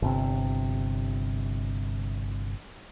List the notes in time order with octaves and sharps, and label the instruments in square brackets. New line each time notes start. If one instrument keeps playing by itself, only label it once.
[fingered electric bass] G1 C3